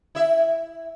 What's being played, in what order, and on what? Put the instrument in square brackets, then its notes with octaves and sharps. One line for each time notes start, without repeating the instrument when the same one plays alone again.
[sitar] E4 E5